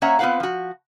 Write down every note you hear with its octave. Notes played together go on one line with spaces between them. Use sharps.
A#3 C#4 C#5 E5 F#5 A#5
B3 C4 F4 B4 F5 F#5
F3 F#4